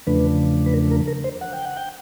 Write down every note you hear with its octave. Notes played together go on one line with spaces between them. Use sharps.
E2 C#3 F3 A3 D4 B4
B4
A#4
A#4
A#4
C5
F#5
G5
F#5
G5